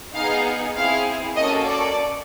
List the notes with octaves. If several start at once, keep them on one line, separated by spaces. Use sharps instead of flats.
B3 D#4 G#4 F5
C4 E4 G#4 F5
A#3 C#4 F#4 A4 D#5
D5